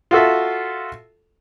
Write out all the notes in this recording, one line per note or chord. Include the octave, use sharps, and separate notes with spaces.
F4 F#4 A4 E5